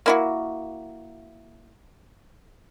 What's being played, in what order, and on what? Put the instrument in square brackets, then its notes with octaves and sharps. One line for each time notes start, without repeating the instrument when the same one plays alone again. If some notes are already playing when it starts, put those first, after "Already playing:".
[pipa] A#3 E4 F#4